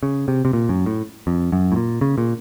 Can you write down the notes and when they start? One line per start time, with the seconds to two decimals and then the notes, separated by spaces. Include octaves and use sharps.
0.03 C#3
0.28 C3
0.45 C3
0.53 A#2
0.69 F#2
0.86 A2
1.27 F2
1.52 F#2
1.72 A2
1.76 A#2
2.01 C#3
2.18 A#2